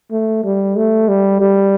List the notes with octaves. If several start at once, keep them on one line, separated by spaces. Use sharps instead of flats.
A3
G3
A3
G3
G3